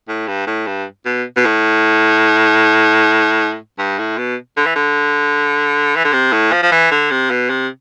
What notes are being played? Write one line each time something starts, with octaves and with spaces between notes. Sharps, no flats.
A2
G2
A2
G2
B2
B2
A2
G2
A2
B2
D3
E3
D3
E3
D3
C3
A2
F3
F3
E3
D3
C3
B2
C3